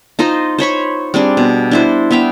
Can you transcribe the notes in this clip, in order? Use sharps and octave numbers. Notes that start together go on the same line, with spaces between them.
D#4 F4 C5 D#5
C5 C#5 B5 C#6
G3 C4 D4 G#4
B2
D4 E4 C5
B3 E5 F5 G5